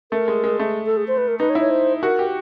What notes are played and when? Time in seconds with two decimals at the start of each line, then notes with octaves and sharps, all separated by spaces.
0.12 A3 A#4
0.28 G#3
0.44 G#3
0.59 A3
0.86 A4
0.97 G#4
1.08 C5
1.18 B4
1.28 A#4
1.40 D#4 B4
1.50 C#5
1.55 E4
1.60 C#5
1.70 C5
2.03 F#4 A#4
2.19 G4